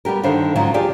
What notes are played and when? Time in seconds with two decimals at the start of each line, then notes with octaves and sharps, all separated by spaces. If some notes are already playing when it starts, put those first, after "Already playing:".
0.05 G3 B3 G4 A#4
0.23 G2 D3 D#3 C5
0.56 G#2 C#3 F3 F#3
0.74 F4 G4 G#4 D5